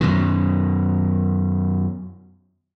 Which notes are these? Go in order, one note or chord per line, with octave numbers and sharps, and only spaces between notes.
F#2 B2 D#3